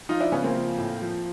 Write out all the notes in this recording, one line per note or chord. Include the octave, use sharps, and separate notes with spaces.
F3 D#4 F4
D4 E4
C#3 B3 C#4
A#3 C4
F3
A2
F3